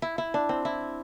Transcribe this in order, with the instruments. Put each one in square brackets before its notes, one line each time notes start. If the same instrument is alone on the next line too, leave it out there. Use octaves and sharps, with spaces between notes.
[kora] E4
E4
D4
C4
E4